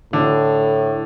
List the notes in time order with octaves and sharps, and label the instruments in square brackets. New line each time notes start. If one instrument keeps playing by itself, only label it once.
[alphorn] A2 [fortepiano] D3